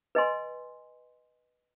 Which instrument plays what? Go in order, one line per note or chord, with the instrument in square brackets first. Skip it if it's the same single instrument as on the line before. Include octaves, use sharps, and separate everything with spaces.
[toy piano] B4 D#5 G#5 C6